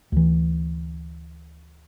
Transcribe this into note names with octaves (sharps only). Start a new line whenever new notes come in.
D2 E3